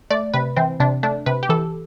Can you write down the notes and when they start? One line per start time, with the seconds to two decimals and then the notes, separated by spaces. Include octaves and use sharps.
0.10 A3 D5
0.34 C3 B4
0.56 E3 C4
0.80 C3 D4
1.03 A3 D4
1.26 C3 B4
1.43 G4
1.49 E3 A4